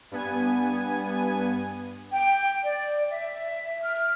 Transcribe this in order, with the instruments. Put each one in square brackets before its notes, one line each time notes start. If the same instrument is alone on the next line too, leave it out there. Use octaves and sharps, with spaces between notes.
[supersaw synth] G2 B3 G#5
[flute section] G5
D5
E5
F6